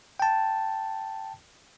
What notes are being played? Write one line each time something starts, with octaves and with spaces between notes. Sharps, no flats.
G5 A5